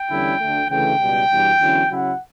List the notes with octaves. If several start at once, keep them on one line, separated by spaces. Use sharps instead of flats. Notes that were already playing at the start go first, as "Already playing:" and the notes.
Already playing: G5
E2 D3 G3 C#4 E4
D2 D3 A3
D2 C#3 E3 A3 G5
C#2 B2 G3
E2 B2 G3 D4
E2 D3 F#3 C#4 E4
C#3 F#3 C#4 E4 F#5